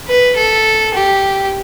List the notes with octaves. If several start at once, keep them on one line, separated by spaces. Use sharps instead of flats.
B4
A4
G4